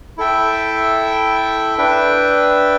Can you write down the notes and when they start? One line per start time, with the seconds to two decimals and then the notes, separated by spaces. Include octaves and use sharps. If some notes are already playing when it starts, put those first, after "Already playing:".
0.18 E4 A4 E5 G5
1.78 D4 B4 E5 G5